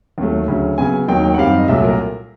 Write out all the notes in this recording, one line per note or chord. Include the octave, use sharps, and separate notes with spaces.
D#2 D#3 F#3 A3
D2 C#3 F#3
C#3 F#3 B3 G#5
D#2 D#3 F#3 A#3 D#4 G5
G5
F#5
F#2 D#3 G3 C4 F5
D#5
C2 A#2 F#3 A3 E5
A#4